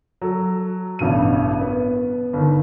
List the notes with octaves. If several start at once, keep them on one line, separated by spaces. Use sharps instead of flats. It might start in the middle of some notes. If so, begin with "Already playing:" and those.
F#3 A4
A1 G2 B2 D#7
B3
G1 D#3